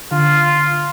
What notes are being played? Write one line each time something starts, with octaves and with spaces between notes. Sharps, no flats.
D3 F4